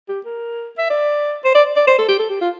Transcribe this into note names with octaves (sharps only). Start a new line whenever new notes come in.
G4
A#4
E5
D5
C5
D5
D5
C5
A4
G4
A4
G4
F4